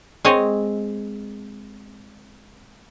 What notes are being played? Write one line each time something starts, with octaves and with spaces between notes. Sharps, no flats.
G#3 C4 C#5 D#5